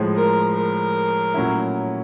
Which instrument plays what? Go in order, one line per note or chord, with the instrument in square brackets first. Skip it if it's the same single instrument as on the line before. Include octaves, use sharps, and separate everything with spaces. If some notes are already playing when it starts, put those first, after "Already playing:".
Already playing: [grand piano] A2 F3 G#3
[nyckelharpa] A#4
A#4
[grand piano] A#2 F#3 A3 C#4 E4